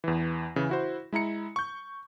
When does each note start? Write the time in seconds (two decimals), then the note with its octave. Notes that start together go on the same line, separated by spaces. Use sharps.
0.04 E2 E3
0.56 C#3 E3
0.69 E4 F#4 C5
1.13 G#3 E4 A#5 C#7
1.56 C#6 G6